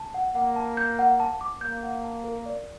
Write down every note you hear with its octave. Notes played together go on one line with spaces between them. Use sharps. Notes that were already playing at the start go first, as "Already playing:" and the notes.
Already playing: A5
F#5
A#3 F#5
A5
G6
F#5
A5
D6
A#3 G6
F#5
A5
A#4
D5